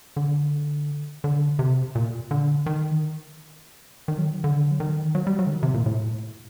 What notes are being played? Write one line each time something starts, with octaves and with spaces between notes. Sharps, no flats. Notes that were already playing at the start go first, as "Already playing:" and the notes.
D3
D3
C3
A#2
D3
D#3
D#3
F#3
D#3
D3
F#3
D#3
F#3
G3
F#3
D3
D#3
C3
A#2
A2